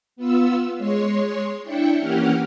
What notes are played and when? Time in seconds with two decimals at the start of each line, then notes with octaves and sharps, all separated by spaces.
0.16 B3 F4 E6
0.77 G#3 C#5 C6
1.63 D4 E4 G5 C#7
1.99 E3 A#3 C#4 G4 F#5 F6